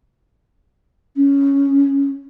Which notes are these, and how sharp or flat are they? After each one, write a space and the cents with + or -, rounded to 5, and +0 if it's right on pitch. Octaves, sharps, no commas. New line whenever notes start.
C#4 +5